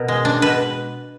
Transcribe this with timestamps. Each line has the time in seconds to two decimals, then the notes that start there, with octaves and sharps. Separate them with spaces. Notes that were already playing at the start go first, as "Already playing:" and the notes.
Already playing: B2 A#4
0.08 G#3
0.25 D4
0.42 B2 B4